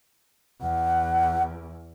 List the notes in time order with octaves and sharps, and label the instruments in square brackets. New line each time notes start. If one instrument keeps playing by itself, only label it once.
[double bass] E2 [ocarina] F#5